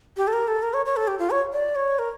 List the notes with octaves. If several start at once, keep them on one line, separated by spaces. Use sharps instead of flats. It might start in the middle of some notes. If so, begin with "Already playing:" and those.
G4
A4
A#4
A4
A#4
C#5
C#5
A4
G4
F4
C#5
D5
C#5
A#4